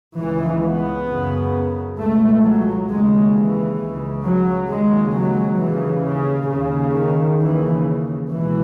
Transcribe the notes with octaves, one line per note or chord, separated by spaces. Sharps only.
C#2 C#3 E3
B3
F#2 C#3
C#2 B2 A3
F#3
D#2 C#3 G#3
E3
C#2 C#3
F#3
D#2 C#3 G#3
F#3
D#2 C#3 E3
C#3
D#2 C#3
D#3
D#2 C#3 E3
C#2 B2 E3